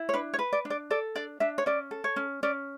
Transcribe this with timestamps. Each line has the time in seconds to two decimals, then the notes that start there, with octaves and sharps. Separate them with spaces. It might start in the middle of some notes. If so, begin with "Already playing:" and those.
Already playing: E4
0.09 C#5
0.14 D4 B4
0.34 C#5
0.39 B4
0.53 D5
0.65 D4
0.70 D5
0.90 A4 D5
1.15 D4 D5
1.40 D4 E5
1.58 C#5
1.66 C#4 D5
1.91 A4
2.04 C#5
2.16 C#4
2.43 C#4 D5